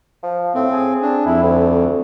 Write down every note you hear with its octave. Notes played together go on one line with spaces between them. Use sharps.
F3
A2 C4
G#4
D4
F2 E4
D2